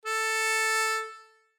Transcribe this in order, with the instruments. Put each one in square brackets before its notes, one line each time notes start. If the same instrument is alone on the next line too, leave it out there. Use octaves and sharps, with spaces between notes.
[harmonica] A4